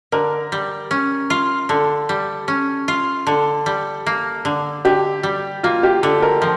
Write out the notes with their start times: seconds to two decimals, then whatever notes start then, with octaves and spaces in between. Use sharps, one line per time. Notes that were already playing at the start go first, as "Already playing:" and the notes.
0.12 D3 A#4
0.52 G3
0.91 C#4
1.30 F4
1.69 D3 A4
2.09 G3
2.48 C#4
2.88 F4
3.27 D3 A4
3.66 G3
4.07 A#3
4.45 D3
4.85 D3 G4
5.23 G3
5.63 A#3 F4
5.83 G4
6.03 D3 A4
6.22 A#4
6.42 F3